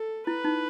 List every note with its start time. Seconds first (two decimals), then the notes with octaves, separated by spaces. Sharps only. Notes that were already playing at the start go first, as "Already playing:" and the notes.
Already playing: A4
0.27 E4 B4
0.45 D#4